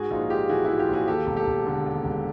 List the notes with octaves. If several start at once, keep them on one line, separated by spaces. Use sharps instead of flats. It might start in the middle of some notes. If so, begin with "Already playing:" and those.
Already playing: G#2 F#4 G#4
A#1 D#4 F4
G#3 F4 G4
E3 F#4 G#4
G#2 E4 F#4
F4 G4
A#1 F#4 G#4
D#2 G4 A4
E1
G4 A4
E1
D3
D#2
E1